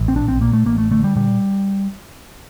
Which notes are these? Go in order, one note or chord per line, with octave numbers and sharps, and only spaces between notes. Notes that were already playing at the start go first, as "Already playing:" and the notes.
Already playing: A1
C4
A#1 D4
C4
A#2 A#3
A3
A1 A#3
A3
D3 A3
G3
A#2 G3